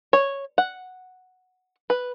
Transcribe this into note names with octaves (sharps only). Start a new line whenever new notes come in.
C#5
F#5
B4